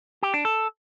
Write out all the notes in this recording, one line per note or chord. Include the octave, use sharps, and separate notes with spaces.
G4
D4
A4